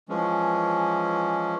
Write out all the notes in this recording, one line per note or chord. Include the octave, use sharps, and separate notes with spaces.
E3 F3 G#3 C#4